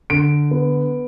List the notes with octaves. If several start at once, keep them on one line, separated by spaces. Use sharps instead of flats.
D3 D7
B3